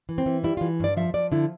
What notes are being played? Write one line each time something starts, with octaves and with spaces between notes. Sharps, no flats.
E3
C4
E3
G3 E4
E3 F4
G2 D5
F3 E5
F3 D5
D3 E4